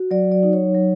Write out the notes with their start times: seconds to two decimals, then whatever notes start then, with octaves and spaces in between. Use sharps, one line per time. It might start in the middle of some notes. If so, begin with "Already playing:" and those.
Already playing: F#4
0.11 F#3 D5
0.32 D5
0.43 D#4
0.53 C#5
0.75 F#3